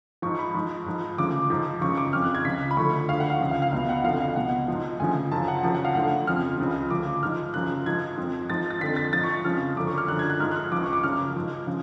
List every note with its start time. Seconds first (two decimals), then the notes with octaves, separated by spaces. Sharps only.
0.22 G#2 F3 C#6
0.39 B5
0.55 G#2 F3
0.86 G#2 F3
1.18 D2 C#3 F3 D6
1.50 G#2 F3
1.81 F#2 C#3 F3 C#6
1.97 D6
2.13 F2 C#3 F3 F6
2.24 F#6
2.35 G#6
2.45 C#2 C#3 F3 B6
2.71 B5
2.77 D2 D3 F3 C#6
3.09 D2 D3 F3 F5
3.20 F#5
3.30 F5
3.41 C#2 C#3 F3
3.51 F5
3.62 F5
3.72 C#2 B2 F5
3.89 F#5
4.04 F2 D3 F3 F5
4.20 F5
4.36 C#2 B2 F#5
4.68 G#2 F3
5.00 D2 C#3 F3 G#5
5.32 F#2 C#3 F3 A5
5.48 F#5
5.63 F#2 C#3 F3 A5
5.74 F#5
5.85 F5
5.95 D2 D3 F3 F#5
6.27 F2 C#3 F3 F6
6.58 C#2 C#3 F3
6.91 D2 C#3 F3 D6
7.23 G#2 F3 F6
7.54 F#2 C#3 F3 F#6
7.86 G#2 F3 G#6
8.18 F2 F3
8.49 G#2 F3 A6
8.71 A6
8.81 F2 D3 F3 B6
8.96 A6
9.13 G#2 F3 A6
9.24 C#6
9.45 F2 C#3 F3 F6
9.76 F#2 D3 F3 D6
9.87 C#6
9.98 F6
10.08 F#2 D3 F3 F#6
10.19 G#6
10.30 F#6
10.40 G#2 F3 F6
10.51 F#6
10.56 F6
10.72 C#2 C#3 F3 D6
10.83 C#6
10.93 D6
11.03 F#2 C#3 F3 F6
11.36 G#2 F3
11.67 C#3 F3